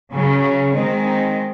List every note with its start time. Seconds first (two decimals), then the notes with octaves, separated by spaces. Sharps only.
0.10 C#3 F#3 C#4
0.72 D#3 G#3 C4
1.04 D#4